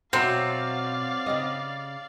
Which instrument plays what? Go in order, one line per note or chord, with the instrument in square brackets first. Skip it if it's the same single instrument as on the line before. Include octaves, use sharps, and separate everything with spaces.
[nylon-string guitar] B2 C#5 E5 [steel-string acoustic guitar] F#3 [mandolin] C4 [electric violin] D5 F5
[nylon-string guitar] C#3 G4 D#5